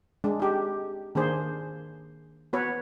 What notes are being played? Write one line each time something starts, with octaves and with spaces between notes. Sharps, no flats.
G#3 D4
D#4 G4
D#3 A#3 D4 G#4 C5
B3 F#4 B4 C#5